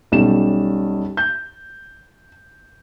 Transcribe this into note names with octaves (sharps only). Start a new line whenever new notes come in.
B1 G3 C#4 E7
G6